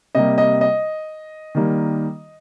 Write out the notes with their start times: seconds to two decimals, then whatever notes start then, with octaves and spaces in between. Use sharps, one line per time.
0.15 C3 G3 A#3 D#5
0.38 D#5
0.61 D#5
1.55 D#3 G3 A#3